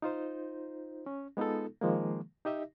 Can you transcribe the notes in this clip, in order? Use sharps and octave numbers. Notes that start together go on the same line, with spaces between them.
D#4 F4 C5
C#4
G#3 B3 D#4 F4 A4
D#3 F3 G#3 A#3
D#4 G4 D#5 E5